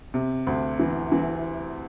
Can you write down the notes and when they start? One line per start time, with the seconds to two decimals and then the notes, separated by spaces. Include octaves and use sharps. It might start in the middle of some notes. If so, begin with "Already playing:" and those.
0.14 C3
0.47 D2
0.80 E3
1.12 E3